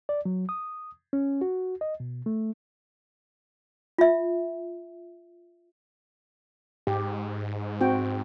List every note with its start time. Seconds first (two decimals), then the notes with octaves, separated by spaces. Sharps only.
0.09 D5
0.25 F#3
0.49 D#6
1.13 C#4
1.41 F#4
1.81 D#5
2.00 B2
2.26 A3
3.98 F4 E5
6.87 G#2 G4
7.81 C4 F#4 G5